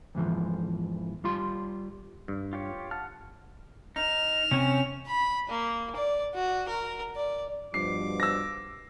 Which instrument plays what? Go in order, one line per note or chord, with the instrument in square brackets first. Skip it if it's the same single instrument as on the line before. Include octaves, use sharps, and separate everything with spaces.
[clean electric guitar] E2 G#2 E3 F3
G3 F4 C6
[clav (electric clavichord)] G2
[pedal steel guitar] F4 G4 C#5
[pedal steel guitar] F#5 F6 [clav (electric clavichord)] A5
[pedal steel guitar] D#4 [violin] F6 E7
[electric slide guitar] C3 C4 G#5 [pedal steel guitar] C#4
[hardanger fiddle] B5
A#3
D5
F#4
A#4
D5
[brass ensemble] G2 B2 F3 [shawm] D6 [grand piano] C7
[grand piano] E6 A#6